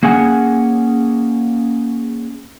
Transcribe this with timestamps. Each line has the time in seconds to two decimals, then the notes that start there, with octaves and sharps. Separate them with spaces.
0.03 A#3 C#4 G#4 F#5 G#5